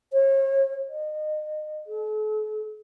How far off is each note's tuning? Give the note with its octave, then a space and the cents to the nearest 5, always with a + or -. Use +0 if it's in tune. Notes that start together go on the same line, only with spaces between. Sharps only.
C#5 -35
D#5 -30
A4 -45